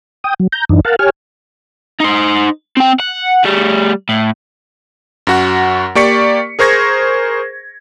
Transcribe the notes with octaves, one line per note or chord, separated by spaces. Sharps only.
G5 D#6
F#3
A#5 G6
F#2 E3 D4 D#4
A#4 F5 F#5 A5
G4 C#5 G#5 F6
D#4 C5
C4 G5
F#5
G3 A3
A2
F#2 F#4 F#5
A#3 G4 D5 C#6 B6 C#7
G#4 A#4 C5 C#6 G#6 A#6